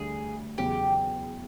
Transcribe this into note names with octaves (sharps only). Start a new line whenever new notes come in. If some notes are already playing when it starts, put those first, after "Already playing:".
Already playing: D2 D3 G3 G#4
E2 C#3 F#3 G4